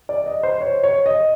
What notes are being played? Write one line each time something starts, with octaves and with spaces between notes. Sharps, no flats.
D5
D#5
C5
C#5
C#5
D#5